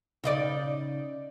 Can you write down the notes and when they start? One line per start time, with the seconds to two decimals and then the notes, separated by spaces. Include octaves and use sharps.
0.24 C#3 D#4 D5